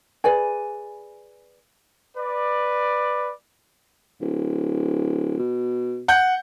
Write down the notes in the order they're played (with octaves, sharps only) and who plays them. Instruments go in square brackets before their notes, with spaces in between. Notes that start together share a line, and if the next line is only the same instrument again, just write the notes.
[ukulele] G#4 B4 D5 G#5
[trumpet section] B4 D5
[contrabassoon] D1
B2
[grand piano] F#5 G6